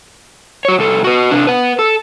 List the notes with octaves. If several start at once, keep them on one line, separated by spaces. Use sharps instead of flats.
F#4 C#5
C2 A4
F#4 B4
C3 D4
B4 F#5
A4